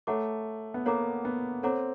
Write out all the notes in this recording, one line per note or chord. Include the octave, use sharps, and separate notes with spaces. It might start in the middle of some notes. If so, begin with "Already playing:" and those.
A3 A4 C#5 F#5 A#5 D6
B3
A#3 A4 C#5 F#5 A#5 D6
B3
C4 A4 C#5 F#5 A#5 D6